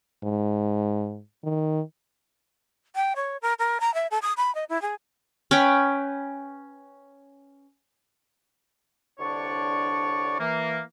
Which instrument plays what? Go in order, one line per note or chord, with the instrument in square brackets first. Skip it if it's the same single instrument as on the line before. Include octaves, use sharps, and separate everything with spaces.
[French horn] G#2
D#3
[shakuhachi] G5
C#5
A#4
A#4
A#5
E5
A4
D#6
B5
D#5
E4
G#4
[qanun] C#4 B4 G5
[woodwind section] C2 D3 D4 C#5 D5 C#6
E3 A#3